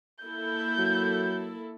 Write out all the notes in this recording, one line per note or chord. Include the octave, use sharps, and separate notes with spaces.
A#3 E4 A4 G6
F#3